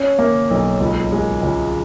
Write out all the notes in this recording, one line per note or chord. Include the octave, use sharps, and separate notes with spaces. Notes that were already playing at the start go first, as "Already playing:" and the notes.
Already playing: C#4
A#3
B1
C#2
G#3
C#2